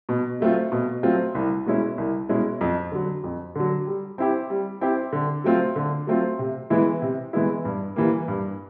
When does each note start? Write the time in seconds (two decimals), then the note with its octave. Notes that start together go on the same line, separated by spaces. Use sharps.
0.09 B2
0.40 F#3 A3 C4 F4
0.72 B2
1.03 F#3 A3 C4 F4
1.35 C2
1.66 B2 G#3 C#4 E4
1.98 C2
2.29 B2 G#3 C#4 E4
2.61 F2
2.92 D3 F#3
3.24 F2
3.55 D3 F#3
3.87 G3
4.18 C4 E4 G4
4.50 G3
4.81 C4 E4 G4
5.13 D3
5.44 F#3 A3 C4 F4
5.76 D3
6.07 F#3 A3 C4 F4
6.39 C3
6.70 E3 G#3 B3 E4
7.02 C3
7.33 E3 G#3 B3 E4
7.65 G2
7.96 E3 G3 A#3
8.28 G2